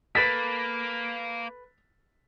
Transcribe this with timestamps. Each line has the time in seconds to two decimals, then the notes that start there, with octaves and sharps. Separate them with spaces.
0.15 A#3 A4 B4 A6 B6